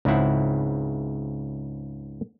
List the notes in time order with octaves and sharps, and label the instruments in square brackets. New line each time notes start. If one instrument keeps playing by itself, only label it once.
[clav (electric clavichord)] C#2 G#2 C#3 C4 E4 F#5